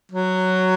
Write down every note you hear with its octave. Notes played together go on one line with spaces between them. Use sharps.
F#3